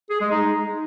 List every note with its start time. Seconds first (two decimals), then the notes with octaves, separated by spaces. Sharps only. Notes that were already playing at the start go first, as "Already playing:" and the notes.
0.10 G#4
0.21 G#3
0.32 D#4